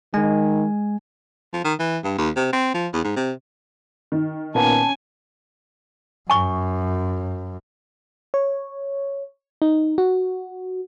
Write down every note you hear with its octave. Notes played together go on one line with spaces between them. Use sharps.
D#3 G#3 G#5
F3
D#3
E3
G2
D#2
C3
C4
F3
E2
G#2
C3
D#3
A#2 A#3 B3 C#4 G#5 A5
F#2 G#5 C#6
C#5
D#4
F#4